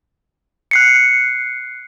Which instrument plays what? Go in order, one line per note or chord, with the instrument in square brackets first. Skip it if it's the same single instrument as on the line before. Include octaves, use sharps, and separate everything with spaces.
[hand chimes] F#6 C7 C#7